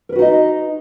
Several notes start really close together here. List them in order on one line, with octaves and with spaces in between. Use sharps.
A#4 B4 F#4 D#4 D#5